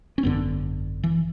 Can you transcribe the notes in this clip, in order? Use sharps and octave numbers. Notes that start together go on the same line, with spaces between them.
C#4
G#1 F#2 D3 B3
E3